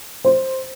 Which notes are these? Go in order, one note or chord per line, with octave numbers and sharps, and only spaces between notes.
C5